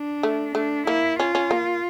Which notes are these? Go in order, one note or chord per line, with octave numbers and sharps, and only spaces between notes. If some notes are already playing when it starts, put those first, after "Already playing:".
Already playing: D4
A3
A3 D4
A#3 E4
C#4 F4
C#4
A#3